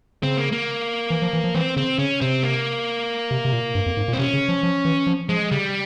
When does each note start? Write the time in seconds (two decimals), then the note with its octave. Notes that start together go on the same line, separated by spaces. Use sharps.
0.23 C#3 C4
0.37 A#3
0.52 A#3
1.10 E3
1.22 F3
1.33 E3
1.44 F3
1.55 E3 C4
1.76 C#3 C4
1.98 C#3 C#4
2.21 C3 C4
2.43 A#3
3.31 C3
3.45 C3
3.53 A#2
3.75 G2
3.86 F2
3.97 G#2
4.08 A#2
4.13 C4
4.19 C3 C#4
4.33 C#3
4.48 F3
4.63 F3
4.85 E3
5.07 F3
5.29 F3 G#3
5.51 C#3 G3